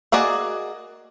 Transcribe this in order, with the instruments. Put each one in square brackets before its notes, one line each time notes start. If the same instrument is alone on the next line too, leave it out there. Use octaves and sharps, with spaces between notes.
[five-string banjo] A#3 F#4 G#4 D5 D#5